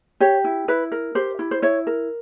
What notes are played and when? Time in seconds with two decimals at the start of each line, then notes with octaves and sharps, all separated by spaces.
0.20 G4 C#5
0.44 E4
0.68 E4 B4
0.92 A#4
1.15 G4 C5
1.39 E4
1.51 C5
1.62 E4 C#5
1.87 A#4